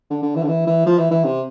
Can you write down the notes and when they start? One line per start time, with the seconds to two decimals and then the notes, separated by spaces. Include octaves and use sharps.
0.10 D3
0.23 D3
0.36 E3
0.43 D3
0.48 E3
0.67 E3
0.86 F3
0.98 E3
1.11 E3
1.24 C3